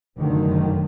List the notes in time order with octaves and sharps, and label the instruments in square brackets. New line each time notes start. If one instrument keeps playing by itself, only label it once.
[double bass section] F1 F#2 D3 D#3